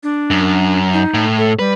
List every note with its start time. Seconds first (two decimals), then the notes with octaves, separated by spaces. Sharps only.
0.03 D4
0.31 F#2
0.93 D#4
1.14 A2
1.38 A4
1.59 G3 B4